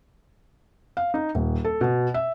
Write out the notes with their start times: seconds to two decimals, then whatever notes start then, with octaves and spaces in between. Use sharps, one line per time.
0.97 F5
1.14 D#4
1.35 D#1
1.64 A4
1.81 B2
2.14 E5